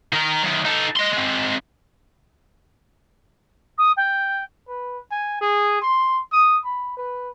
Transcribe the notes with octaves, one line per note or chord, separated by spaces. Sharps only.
D#3 A#4
F#2 D#3
D#4 A4
D#5 C6
G#3 C4
D#6
G5
B4
G#5
G#4
C6
D#6
B5
B4